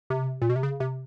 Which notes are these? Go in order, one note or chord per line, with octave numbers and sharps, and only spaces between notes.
C3
A#2
B2
C3
C#3
C3